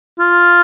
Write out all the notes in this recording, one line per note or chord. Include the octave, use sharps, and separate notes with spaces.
F4